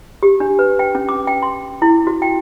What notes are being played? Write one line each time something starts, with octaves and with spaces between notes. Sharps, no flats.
G4
D4
B4
G5
C#4
D6
G5
C6
E4
F#4
G5